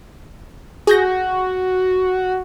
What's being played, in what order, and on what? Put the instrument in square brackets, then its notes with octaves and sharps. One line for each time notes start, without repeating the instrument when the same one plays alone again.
[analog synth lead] F#4 [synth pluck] G#4 G6 A#6